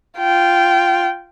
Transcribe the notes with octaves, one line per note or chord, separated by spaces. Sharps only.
F4 G5